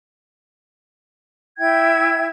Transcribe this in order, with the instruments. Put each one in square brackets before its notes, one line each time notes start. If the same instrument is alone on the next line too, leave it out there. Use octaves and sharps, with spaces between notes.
[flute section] E4 E5 G5 G#6